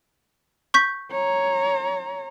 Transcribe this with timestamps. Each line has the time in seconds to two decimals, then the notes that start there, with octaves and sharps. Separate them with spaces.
0.74 C#6 G6 B6
1.11 C#5 A#5